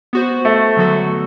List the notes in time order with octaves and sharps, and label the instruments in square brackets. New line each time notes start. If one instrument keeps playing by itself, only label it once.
[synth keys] B3 F#4 C5
[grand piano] A3
[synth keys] D3 F#3 B3 F#4 A4